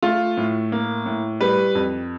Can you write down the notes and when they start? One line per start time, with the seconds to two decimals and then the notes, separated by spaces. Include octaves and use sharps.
0.03 A3 F4
0.37 A2
0.72 A#3
1.06 A2
1.41 G3 B4
1.75 F2